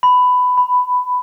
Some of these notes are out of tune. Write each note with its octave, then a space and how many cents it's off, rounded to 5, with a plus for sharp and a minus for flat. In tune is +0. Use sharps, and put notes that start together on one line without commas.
B5 +15
B5 +5